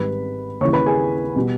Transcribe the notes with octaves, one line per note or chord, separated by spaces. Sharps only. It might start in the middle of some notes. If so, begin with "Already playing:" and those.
Already playing: G#1 G#2 D#3 G3 B4 B5
D#2 C#3 E3 G3 C#5 C#6
B4 B5
G#4 G#5
B2 G3